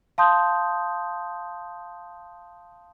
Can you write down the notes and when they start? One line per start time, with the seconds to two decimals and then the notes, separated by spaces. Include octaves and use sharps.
0.18 F5 A5 C6 D#6 G6